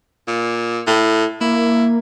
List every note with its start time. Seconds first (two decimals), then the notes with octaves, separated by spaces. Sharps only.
0.27 A#2
0.87 A2
1.41 A#3 E4